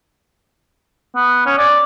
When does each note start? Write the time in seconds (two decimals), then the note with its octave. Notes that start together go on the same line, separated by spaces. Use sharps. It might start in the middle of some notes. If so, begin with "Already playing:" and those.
1.16 B3
1.46 C#4
1.58 D5